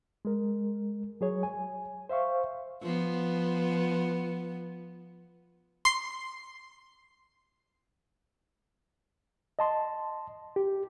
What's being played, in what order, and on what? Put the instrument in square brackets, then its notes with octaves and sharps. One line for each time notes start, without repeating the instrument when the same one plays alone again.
[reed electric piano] G#3 A#4
F#3 G#4 C#5
G#5
C5 E5 F5 C#6
[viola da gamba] F3 B3
[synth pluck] C6 C7
[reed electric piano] D#5 A5 C6
G4